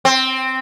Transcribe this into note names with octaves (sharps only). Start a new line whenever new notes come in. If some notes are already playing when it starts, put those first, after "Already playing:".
C4